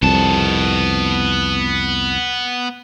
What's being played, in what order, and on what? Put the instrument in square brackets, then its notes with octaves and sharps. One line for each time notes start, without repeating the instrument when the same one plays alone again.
[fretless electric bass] C2 F2 [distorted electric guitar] B3 A5